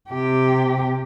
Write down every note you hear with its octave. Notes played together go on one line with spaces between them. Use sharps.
C3 G4